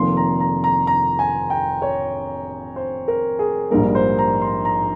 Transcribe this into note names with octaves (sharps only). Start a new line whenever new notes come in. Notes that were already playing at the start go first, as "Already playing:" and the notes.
Already playing: F1 F2 D#3 A#3 C6
A#5
A#5
A#5
A#5
G#5
G5
C#5
C5
A#4
G#4
A#1 G#2 G3 A#3 A#4
C5
A#5
C6
A#5